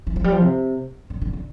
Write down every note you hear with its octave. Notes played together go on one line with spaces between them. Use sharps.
E3
F3
G3
F3
C3
D3
D3
D3